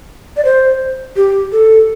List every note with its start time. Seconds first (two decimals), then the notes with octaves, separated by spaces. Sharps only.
0.37 D5
0.45 C5
1.16 G4
1.52 A4